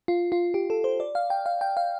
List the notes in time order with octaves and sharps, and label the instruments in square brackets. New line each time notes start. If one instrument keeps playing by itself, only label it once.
[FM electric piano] F4
F4
G4
A4
C5
D5
F5
G5
F5
G5
F5